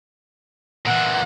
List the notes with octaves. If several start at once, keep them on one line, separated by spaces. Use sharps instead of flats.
A#2 E3 F#5